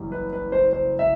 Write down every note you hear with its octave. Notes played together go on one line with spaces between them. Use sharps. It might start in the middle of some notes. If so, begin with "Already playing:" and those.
Already playing: F#1 F#2 E3 G3
B4
B4
C5
C5
E5